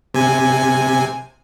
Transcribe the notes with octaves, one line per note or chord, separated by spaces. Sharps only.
C3 G#5